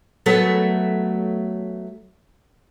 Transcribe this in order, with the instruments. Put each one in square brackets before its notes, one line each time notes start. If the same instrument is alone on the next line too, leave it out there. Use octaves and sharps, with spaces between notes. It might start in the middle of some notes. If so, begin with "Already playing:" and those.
[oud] F#3 A3 B3